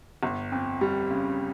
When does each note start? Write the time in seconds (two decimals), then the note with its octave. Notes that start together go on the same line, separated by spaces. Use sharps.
0.23 G1
0.52 F2
0.81 G3
1.11 C#3